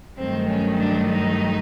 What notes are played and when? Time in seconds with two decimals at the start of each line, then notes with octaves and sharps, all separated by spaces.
0.18 G2 D#3 F#3 A3 C4
0.49 C#4
0.79 D4
1.09 D#4